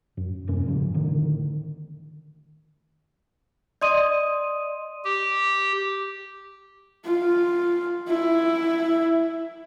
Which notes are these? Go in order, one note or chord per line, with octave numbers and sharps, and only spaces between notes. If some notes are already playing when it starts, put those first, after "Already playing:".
F#2
D#1 F#2 C3 C#4
E2 G#2 C#3 F3
A1 A2 D3 D#3
D5 D#5 C6 D#6 D#7
G4
F4
E4